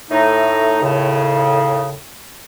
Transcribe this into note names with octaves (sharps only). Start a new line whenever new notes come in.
A2 A3 D#4
D#2 A2 C#3